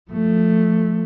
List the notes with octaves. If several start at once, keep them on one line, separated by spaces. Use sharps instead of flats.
F3 A3